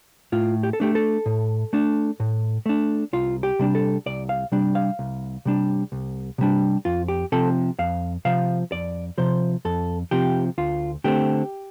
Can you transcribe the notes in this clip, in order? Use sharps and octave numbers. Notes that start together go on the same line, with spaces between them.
A2 F4
G4
A4
A3 D4 G4
A4
A2
A3 D4
A2
A3 D4
C2 F4
G4
C3 G3 D4
A4
C2 D5
F5
C3 G3 D4
F5
C2
C3 G3 D4
C2
C3 G3 D4
F2 F4
G4
C3 F3 A4
F2 F5
C3 F3 F5
F2 D5
C3 F3 C5
F2 A4
C3 F3 G4
D2 F4
D3 A3 C4 G4